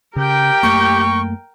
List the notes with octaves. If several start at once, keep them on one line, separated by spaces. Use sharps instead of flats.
C#3 G4 A#4 G5
F#2 A3 A#3 C#6